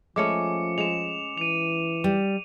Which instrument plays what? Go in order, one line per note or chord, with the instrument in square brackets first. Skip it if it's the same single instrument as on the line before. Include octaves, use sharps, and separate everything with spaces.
[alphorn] F3 [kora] G#3 A3 C#4 [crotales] D6 C#7
[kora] G#3 [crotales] E7 F7
[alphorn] E3 [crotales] D#7 F7
[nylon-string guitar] G3